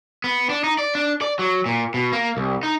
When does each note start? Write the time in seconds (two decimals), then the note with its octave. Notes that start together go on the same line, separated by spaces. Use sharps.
0.24 B3
0.50 D4
0.64 D#4
0.79 D5
0.95 D4
1.22 D5
1.39 F#3
1.66 A#2
1.94 B2
2.13 A#3
2.37 C2
2.63 D#4